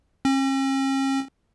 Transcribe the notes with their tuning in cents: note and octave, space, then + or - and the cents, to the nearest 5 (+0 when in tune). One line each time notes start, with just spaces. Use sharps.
C#4 -45